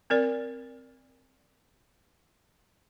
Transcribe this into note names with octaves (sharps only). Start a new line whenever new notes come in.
C4 A#4 D5